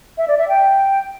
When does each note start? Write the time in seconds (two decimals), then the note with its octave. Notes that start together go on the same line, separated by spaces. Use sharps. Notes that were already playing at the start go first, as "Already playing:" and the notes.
0.18 E5
0.28 D5
0.38 E5
0.49 G5